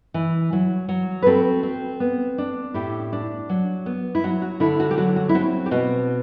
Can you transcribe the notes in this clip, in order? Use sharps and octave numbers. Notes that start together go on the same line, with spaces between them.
E3
F#3
F#3
B4
C4 F#4 A4
C4
B3
D4
A2 E4 G4
D4
F#3
B3
E4
F#3 F#4
F#4
D3 E4
F#4
G4
F#3 F#4
F#4
E4
C4 F#4
G4
B2 F#4